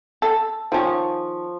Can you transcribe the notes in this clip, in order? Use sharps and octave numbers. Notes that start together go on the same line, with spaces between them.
A4
D#3 F3 C#4 C#6